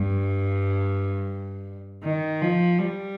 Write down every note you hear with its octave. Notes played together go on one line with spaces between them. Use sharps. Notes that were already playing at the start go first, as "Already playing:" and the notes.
Already playing: G2
D#3
F3
G3